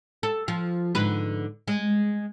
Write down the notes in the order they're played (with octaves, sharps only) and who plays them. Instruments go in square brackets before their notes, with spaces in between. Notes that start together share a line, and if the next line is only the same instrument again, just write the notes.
[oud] A4
F3 F4
G#2 D3 B4
G#3